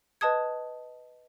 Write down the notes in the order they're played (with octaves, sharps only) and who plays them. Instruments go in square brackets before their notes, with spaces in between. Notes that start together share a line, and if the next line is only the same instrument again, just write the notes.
[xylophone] B4 D#5 A5 D#6 G#6